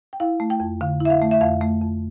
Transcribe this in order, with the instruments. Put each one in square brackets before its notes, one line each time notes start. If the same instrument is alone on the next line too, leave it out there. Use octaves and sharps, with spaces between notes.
[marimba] G5
E4 F5
A3
G5
F2
D3 F5
E4 E5
F5
A3
E5
F2 F5
A3
F2